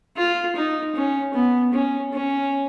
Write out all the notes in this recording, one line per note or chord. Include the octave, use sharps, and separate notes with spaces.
F4
D#4
C#4
B3
C#4
C#4